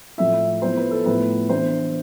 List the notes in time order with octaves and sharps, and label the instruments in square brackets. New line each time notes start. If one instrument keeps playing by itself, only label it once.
[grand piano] A2 F3 A3 E4 E5
F3 B3 E4 C5
B4
A4
A2 F3 B3 E4 B4
E3 B3 D4 C5